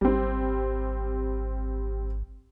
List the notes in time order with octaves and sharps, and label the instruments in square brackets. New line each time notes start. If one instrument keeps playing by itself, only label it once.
[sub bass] G#1 [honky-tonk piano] G3 C4